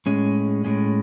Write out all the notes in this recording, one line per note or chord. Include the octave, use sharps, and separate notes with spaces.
A2 G#3 C#4
A2 G#3 C#4